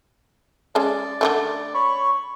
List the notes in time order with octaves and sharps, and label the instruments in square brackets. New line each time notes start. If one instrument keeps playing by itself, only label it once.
[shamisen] G#3 C#4 A4 [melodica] D5
[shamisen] D3 D#3 A3
[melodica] C#5 B5 C#6